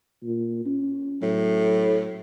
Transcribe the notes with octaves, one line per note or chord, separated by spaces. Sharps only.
A#2
C#4
A2 F#3